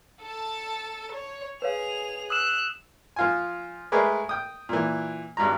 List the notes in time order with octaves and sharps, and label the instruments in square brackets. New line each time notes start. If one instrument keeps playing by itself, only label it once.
[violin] A4 A5
C#5
[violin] G#4 F7 [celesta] B4 C#5 F5
[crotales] D#6 E6 E7 [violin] F#6
[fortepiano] F3 F4 G#5
G#3 A3 G#4 A#4 B4 D5
G5 D#6
A#2 E3
G#1 G2 F#3 A#5